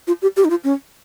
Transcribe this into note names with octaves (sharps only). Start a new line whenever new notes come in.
F4
G4
G4
D#4
F4
C#4